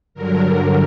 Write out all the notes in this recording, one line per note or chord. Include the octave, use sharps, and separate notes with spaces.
G2 D3 F#3 A#4